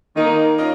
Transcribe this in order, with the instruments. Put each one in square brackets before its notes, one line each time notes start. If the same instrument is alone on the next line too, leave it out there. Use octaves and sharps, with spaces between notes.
[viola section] D#3 D#4 [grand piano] A#3
[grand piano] C#4 F4 A#4 D#5